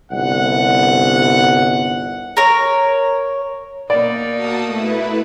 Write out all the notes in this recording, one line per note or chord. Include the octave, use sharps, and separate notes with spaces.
G1 C2 F#5
A#4 C#5
B2 A#3 D#4 D5
F#4 A5 D#6
A3 E4 B4